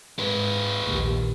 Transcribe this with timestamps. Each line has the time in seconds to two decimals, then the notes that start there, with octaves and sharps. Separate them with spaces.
0.19 G#2 G#3 B4
0.83 A#1 D#2